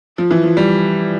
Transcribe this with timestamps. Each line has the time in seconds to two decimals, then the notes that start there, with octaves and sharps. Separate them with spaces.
0.18 F3
0.31 E3
0.44 F3
0.57 G3